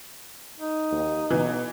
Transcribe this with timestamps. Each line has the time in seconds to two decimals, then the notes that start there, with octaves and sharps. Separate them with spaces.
0.58 D#4
0.92 D#2
1.31 B2 E3